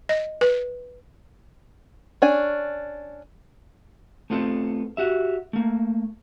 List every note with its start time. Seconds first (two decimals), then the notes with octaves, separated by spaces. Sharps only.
0.09 D#5
0.41 B4
2.22 C#4 D4 G#5
4.30 A3 B3 C4 F4 A4
4.97 F#4 G4 E5
5.53 A3 A#3